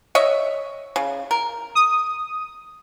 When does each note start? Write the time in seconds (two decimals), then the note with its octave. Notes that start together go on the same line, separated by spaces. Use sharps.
0.15 C#5 D#5 E5
0.96 C#3
1.31 A#4
1.75 D#6